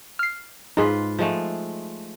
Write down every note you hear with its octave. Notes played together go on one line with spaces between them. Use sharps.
F6 C7
G#2 D#4 F4 G#4 B4
F3 G#3 A3